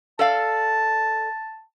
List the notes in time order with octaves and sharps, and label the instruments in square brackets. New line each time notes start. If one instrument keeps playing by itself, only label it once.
[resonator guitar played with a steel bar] A4 D5 F5 [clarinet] A5